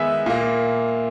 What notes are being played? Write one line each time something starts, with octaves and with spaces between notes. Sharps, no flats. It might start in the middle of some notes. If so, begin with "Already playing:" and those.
Already playing: D#3 G#3 B3 E5 G#5
A#2 A#3